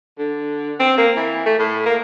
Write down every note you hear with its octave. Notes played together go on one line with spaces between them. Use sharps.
D3
C4
A#3
E3
A3
A2
A#3